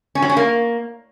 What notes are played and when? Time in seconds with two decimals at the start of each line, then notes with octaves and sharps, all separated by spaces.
0.15 C#4
0.22 F#3
0.30 C#4
0.37 A#3